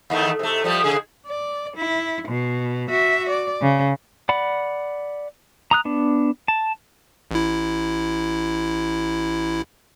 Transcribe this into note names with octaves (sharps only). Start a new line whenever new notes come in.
D#2 D#3 A3
C3 A3
F3 G3 A3
C#3 G#4
D5
E4
B2
F#4 E5
D5
C#3
D5 F#5 B5
A#5 D#6 F#6
B3 D4
A5
A1 E4